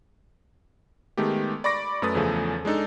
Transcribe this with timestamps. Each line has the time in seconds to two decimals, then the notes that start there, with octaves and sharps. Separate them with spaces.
1.17 D#3 G#3 A3 B3 G4
1.64 D5 B5 C#6 D6 A#6 D7
2.02 F#2 A3 B4 D#6 A6
2.15 E2 C#3 F3 A3 G#4 A4
2.65 G#3 D4 D#4 A4